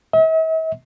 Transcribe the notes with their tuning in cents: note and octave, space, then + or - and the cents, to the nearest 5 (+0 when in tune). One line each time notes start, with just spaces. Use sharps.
E5 -45